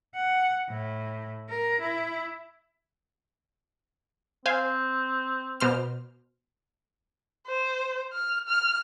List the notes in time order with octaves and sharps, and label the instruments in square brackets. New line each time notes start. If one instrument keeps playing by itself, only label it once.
[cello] F#5
A2
A#4
E4
[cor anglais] C4 [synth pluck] C5 F5 G#5
[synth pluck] B2 C5 F6
[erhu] C5
F6
F6